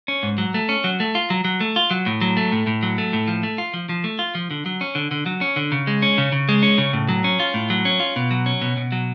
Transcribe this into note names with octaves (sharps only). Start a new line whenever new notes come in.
C#4
G#2
F#3
A3
C#4
F#3
A3
F4
F#3
F#3
A3
F4
F#3
A2
F#3
A3
A2
A2
F#3
A3
A2
F3
A3
F4
F3
F3
A3
F4
F3
D3
F#3
C#4
D3
D3
F#3
C#4
D3
C#3
G#3
C#4
C#3
C#3
G#3
C#4
C#3
A2
F#3
C#4
F4
A2
F#3
C#4
F4
B2
F#3
C#4
B2
B2
F#3